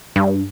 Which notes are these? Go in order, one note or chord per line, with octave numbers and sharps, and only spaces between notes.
G2